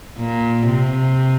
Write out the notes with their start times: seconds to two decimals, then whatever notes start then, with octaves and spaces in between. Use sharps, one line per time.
0.18 A#2
0.67 C3